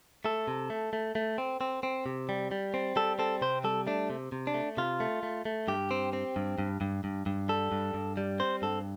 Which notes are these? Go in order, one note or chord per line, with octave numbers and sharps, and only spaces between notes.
A3 A4
C3
A3
A3
A3
C4
C4
C4
C3
G3
G3
C4
G3 A4
C4 A4
C3 C5
G3 A4
A3 D4
C3
C3
D4
A3
C3 F4
A3
A3
A3
G2 G4
C4
C4
G2
G2
G2
G2
G2
G3 A4
G2
G2
G3
C4 C5
G2 A4